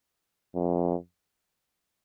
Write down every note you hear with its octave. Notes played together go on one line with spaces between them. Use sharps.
F2